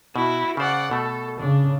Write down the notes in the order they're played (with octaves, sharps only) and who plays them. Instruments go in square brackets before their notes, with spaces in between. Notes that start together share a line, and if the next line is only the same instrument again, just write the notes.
[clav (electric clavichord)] B2 [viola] E4 F#4
[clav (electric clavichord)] C#3 C5 [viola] D5 F#5
[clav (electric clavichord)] B2 A3 [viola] A4
[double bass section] C#3 [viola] D4